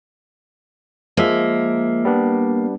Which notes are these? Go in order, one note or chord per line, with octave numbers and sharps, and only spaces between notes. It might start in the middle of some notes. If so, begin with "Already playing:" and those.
F3 G#3 A#3 E5
G3 B3 D4